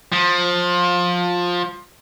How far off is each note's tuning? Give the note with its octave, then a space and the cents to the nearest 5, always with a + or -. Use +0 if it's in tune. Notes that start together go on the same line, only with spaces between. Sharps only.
F3 +20